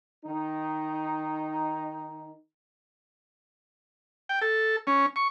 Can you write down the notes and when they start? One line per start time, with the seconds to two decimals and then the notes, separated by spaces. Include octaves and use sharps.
0.24 D#3 D#4
4.29 G5
4.41 A4
4.87 C#4
5.16 C#6